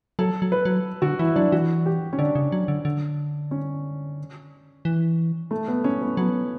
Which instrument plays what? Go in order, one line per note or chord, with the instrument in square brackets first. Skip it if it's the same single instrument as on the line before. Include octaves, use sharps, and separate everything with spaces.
[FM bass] F#3 [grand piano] A4
[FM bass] F#3
[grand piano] B4
[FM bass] F#3
[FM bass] D3 [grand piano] F#4
[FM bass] E3 [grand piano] E4
[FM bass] F#3 [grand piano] D4
[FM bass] E3 [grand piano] F#4
[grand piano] G4
C#4
[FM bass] D3 [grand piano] D4
[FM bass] C#3
F#3
D3
D3
[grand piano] C#4
[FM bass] E3
[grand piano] A3
B3
C#4
B3
[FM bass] F#3 [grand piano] B3